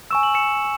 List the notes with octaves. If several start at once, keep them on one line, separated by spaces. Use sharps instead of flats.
G#5 C#6 E6 E7
F#7
C#7 E7